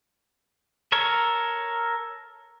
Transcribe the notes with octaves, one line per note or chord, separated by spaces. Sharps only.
A4 A#4 C#5